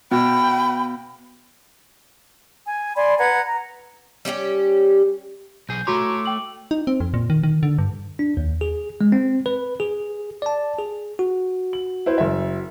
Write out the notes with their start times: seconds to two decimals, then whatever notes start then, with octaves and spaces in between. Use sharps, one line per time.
0.11 B2 B3 G5 B5
2.66 G#5
2.95 D5 G#5 B5 C6
3.18 B4 F#5 A#5 G#6
3.45 A#5
4.25 G3 C#4 F4 G4
5.69 B1 G#4 G6
5.87 A3 F#4 C#5 A#5 C6 D6
6.26 G5 F#7
6.71 D#4
6.87 C4
7.00 F2
7.14 A#2
7.30 D#3
7.43 D#3
7.63 D3
7.78 G2
8.19 D4
8.37 D#2
8.61 G#4
9.01 G#3
9.12 C4
9.46 B4
9.80 G#4
10.42 D5 A5
10.79 G#4
11.19 F#4
11.73 F#7
12.06 E4 B4 C5
12.18 F#1 E5